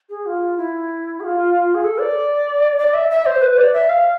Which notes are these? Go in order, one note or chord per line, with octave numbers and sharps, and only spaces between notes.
G#4
F4
E4
G#4
F4
G#4
A4
D5
D5
E5
E5
C5
B4
D5
E5
F5